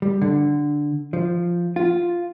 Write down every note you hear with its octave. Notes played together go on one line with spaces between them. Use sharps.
G3
D3
F3
F4